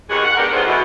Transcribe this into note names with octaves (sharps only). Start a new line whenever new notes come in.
D#2 B2 D#3 F#4 G#4 F#5
F#5
G#3 B3 D4 G4 A#4
D#2 A3 B3 F4 G#4 C5
B2 E3